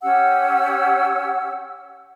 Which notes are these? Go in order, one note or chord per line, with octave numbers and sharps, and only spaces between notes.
C#4 G4 F#5 E6